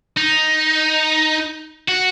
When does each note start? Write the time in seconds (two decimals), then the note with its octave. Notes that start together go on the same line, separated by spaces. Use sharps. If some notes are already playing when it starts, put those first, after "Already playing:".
0.17 D#4
1.89 F#4